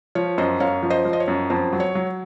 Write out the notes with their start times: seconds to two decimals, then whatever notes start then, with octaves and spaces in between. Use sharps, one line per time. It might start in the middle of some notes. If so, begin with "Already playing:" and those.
0.15 F3 C#5
0.38 F#2 C5 D#5
0.60 F#2 C#5 F5
0.83 F3
0.90 C5 D#5
1.05 F3
1.13 D#5
1.20 C#5
1.28 F#2
1.50 F2 C5
1.73 F#3
1.80 C#5
1.95 F#3